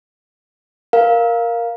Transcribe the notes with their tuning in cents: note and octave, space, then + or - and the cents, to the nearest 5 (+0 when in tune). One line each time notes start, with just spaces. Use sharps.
A#4 +5 F5 +0